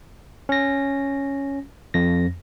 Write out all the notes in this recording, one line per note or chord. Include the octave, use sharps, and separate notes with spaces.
C#4 A#6
F2 A#6